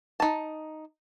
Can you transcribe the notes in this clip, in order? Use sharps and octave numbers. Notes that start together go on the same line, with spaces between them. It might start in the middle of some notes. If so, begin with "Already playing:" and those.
D#4 A5